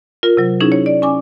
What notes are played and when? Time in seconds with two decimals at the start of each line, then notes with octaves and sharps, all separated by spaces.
0.23 F4 A#4
0.37 C3 F#3
0.60 C#4 D#4 E4 G#4
0.72 C#5
0.86 D5
1.02 C#4 G#5 D6